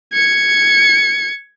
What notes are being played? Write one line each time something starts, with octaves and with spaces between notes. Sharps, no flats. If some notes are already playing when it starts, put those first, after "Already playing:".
G#6 C#7